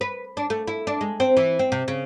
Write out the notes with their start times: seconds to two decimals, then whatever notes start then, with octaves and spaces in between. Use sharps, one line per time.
0.01 B4
0.37 D4
0.50 A3
0.67 E4
0.87 D4
1.01 G#3
1.20 C4
1.37 E3
1.59 C4
1.72 C3
1.88 C#3